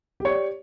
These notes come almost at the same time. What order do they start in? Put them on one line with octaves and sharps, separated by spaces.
G4 C#5 D5